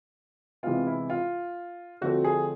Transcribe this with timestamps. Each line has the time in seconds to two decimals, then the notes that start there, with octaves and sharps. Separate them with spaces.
0.63 C3 E3 G#3 B3 F4
0.87 E4
1.10 F4
2.01 D3 F3 A3 C4 F#4
2.24 G#4